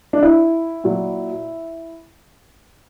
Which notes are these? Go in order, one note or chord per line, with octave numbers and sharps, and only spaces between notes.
D4
E4
A#2 F#3